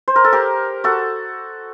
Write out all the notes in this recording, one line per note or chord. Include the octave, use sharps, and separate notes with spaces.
C5
A#4
A4
G4 A#4
F#4 A4